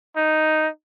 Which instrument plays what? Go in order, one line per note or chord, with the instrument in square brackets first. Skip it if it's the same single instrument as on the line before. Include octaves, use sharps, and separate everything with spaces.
[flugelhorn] D#4